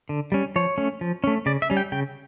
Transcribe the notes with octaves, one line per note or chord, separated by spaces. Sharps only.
D3
G3 C#4
F3 C#5
A3 C#4
F3
A3 C#4
C#3 D5
E5
G3 C#4
G5
C#3 G5